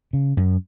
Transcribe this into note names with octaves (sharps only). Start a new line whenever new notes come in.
C#3
F#2